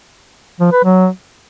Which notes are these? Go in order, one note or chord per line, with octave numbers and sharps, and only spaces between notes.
F3
B4
F#3